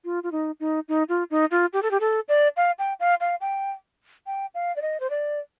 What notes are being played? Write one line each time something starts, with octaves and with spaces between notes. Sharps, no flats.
F4
F4
D#4
D#4
D#4
F4
D#4
F4
G4
A4
G4
A4
D5
F5
G5
F5
F5
G5
G5
F5
D5
D#5
C5
D5